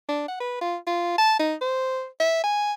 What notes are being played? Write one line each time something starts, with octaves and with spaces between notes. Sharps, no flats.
D4
F#5
B4
F4
F4
A5
D#4
C5
E5
G#5